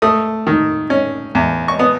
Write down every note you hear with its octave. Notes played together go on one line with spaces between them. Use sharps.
A3 D#6
D#3
C#4
E2
C#6
B3 D#6